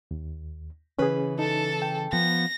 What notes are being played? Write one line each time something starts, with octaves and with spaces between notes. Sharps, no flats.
D#2
C#3 E3 C#4 G#4 B4
D#4 A4 A5
G5
F3 B3 A#6